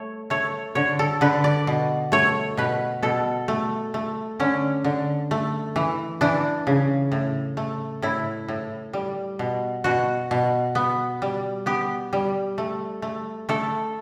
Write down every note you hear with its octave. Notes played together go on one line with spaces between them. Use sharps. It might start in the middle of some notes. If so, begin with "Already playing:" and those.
Already playing: A3 C#5
A3 C#5
D3 C#5
A4
D3 B4
D5
B2
A3 C#5
B2 B4
B2 A4
A3
A3
D3 C#4
D3
A3
E3
E3 D4
C#3
A2
A3
A2 E4
A2
G3
B2
B2 F#4
B2
B3
G3
B3 G4
G3
A3
A3
A3 A4